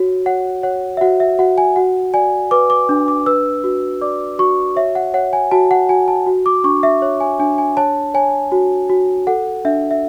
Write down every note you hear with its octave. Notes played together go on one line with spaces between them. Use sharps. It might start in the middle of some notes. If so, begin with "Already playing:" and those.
Already playing: F#4 C#5
C#5 F#5
C#5 F#5
E5
F#4 F#5
E5
F#4 F#5
G#5
F#4 F#5
D5 G#5
B4 D6
D6
D4
D6
B4 E6
F#4
D5 D6
F#4 C#6
C#5 E5
F#5
C#5 F#5
G#5
F#4 A5
F#5
F#4 G#5
A5
F#4
D6
D4 C#6
E5
C#5
G#5
D4 G#5
G#5
C#5 A5
C#5 G#5
F#4
F#4
A4 F#5
D4 E5
E5